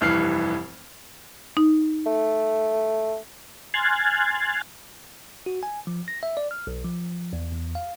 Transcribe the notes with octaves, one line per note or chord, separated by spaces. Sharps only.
F1 G2 E3 F6 C7
D#4
A3
G#5 C6 F6 F#6 G#6 A6
F#4
G#5
F3
A#6
E5
D5
F6
B1
F3
E2
E2
F5